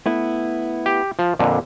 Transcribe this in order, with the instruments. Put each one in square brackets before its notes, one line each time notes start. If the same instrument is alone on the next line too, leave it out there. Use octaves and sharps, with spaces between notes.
[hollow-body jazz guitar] A3 B3 E4
[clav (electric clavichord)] G4
F3
F2 A#2 D3